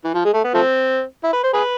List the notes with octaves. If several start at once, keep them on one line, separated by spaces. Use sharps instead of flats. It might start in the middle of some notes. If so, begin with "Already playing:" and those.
E3
F3
G#3
A3
B3
F3 A3 C4
E4
B4
C5
G#4 B4